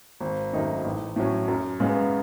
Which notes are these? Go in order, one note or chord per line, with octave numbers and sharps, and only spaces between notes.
G#1
F#2 D#3 A3 D#4
A1
A2 F#3 C#4
F#2
C#3 G#3 B3